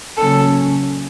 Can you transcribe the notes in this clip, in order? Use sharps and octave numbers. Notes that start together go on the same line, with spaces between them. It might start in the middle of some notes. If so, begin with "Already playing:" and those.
C#3 F#3 A#3 C#4 A4